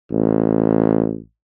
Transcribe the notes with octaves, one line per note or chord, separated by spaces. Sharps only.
A1